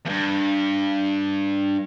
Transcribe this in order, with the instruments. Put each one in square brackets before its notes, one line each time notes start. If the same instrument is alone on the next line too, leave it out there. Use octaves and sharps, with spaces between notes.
[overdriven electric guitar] E2 G2